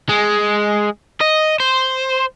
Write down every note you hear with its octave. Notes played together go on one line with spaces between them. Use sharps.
G#3
D#5
C5